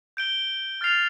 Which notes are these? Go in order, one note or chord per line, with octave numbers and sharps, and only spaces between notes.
G6 D7 G7
F6 A6 C7 F7